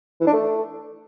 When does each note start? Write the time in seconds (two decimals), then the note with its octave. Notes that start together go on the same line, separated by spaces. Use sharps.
0.21 E3
0.27 D4
0.33 A3